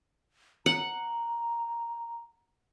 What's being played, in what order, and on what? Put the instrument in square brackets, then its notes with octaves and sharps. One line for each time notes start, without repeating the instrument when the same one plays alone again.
[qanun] F#5 [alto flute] A#5